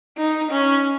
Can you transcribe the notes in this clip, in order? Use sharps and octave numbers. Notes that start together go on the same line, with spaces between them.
D#4
C#4